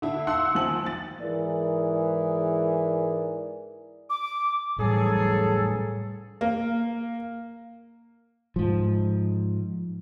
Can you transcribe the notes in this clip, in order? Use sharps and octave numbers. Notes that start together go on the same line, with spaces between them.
D3 E4
D#4 F5 F#5 C6 E6
D#3 F3 G#5 F#7
A6
G#2 E3 G#4 A#4 D5
D6
A2 E3 F#3 G3 G#4 A4
A#3
G#2 F3